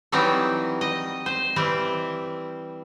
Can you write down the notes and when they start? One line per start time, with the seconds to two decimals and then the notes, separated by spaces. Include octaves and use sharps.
0.12 E3 F#3 G3 C4 D#4 E4
0.81 D#5
1.26 C5
1.56 E3 G3 C4 E4